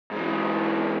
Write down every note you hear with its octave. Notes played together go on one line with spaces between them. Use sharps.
G#2 E3